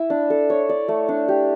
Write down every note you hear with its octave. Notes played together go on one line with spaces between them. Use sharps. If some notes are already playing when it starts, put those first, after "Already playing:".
Already playing: E4 E5
D4
A4
C#5
D5
A3
D4
G4